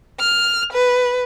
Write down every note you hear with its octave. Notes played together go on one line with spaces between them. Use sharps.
F6
B4